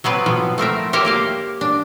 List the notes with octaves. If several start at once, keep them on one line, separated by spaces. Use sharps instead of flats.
F#3 B3 C4 B4
B2 F3 B3
A3 C4 A#4 E5
G4 A#4 C5 C#5 E5 A5
A#3 G4 F5
D4